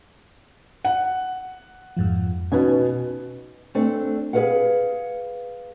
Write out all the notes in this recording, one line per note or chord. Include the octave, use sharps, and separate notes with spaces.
F#5
F2 G#2 F3
B2 B3 C#4 D#4 G#5
A3 C4 D4
G#4 A#4 B4 F5 F#5